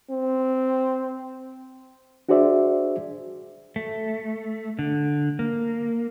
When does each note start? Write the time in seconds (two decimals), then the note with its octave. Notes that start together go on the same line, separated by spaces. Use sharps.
0.10 C4
2.29 D4 F#4 G#4 C5 D5 E5
3.76 A3
4.79 D3
5.39 A#3